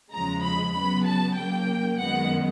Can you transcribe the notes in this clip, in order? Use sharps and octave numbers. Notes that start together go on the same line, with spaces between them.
E2 C#3 F3 G#3 A#5
B5
C#3 F#3 B3 B5
A5
C#3 F#3 A#3 G5
F#2 D#3 G#3 B3 F#5